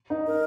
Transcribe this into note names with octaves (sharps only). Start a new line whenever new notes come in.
D#4
A#4